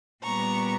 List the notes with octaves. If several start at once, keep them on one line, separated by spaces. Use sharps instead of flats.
A#2 G3 B3 A#5 C#6